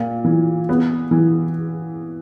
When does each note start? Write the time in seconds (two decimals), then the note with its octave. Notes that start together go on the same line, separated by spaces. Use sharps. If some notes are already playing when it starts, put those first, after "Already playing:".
Already playing: A#2 A#3
0.25 E3
0.69 B3
1.11 E3